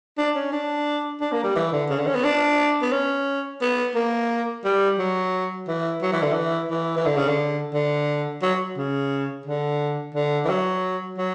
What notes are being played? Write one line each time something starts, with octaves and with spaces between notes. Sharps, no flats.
D4
C#4
D4
D4
A#3
G3
E3
D3
C#3
D3
C#4
B3
D4
B3
C#4
B3
A#3
G3
F#3
E3
F#3
E3
D3
E3
E3
E3
D3
C#3
D3
D3
F#3
C#3
D3
D3
E3
F#3
F#3